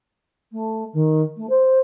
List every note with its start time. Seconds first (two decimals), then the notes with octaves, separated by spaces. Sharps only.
0.52 A3
0.93 D#3
1.37 A3
1.49 C5